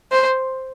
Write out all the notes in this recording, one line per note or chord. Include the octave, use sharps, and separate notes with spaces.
C5